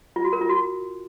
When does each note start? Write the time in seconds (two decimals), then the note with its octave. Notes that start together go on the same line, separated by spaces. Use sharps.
0.16 F4
0.24 F#4
0.33 A#4
0.41 F4
0.49 F#4